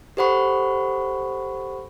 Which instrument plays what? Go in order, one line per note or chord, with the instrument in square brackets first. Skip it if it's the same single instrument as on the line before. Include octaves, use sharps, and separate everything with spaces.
[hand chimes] G4 A4 C5 F#5 B5 C#6